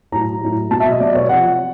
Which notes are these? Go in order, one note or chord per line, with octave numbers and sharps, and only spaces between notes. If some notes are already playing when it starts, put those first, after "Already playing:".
A2 F#3 A#5
A2 F#3
B2 F#3 A5
E5
D#5
B2 F#3 D5
C#5
C3 F3 F#5